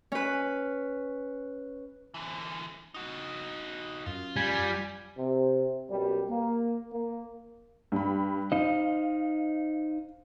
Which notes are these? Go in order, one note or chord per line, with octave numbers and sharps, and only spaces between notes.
C#4 B4
D3 E3
D#4 F#4
F#2 F4
G3 G#5
C3
F#2 B2 G3
A#3
A#3
G2 B5
D#4 C5 D#5 F5